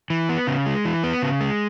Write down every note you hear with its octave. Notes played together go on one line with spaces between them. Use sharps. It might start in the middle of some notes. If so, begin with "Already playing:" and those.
E3
B3
C#3
G#3
E3
B3
C#3
G#3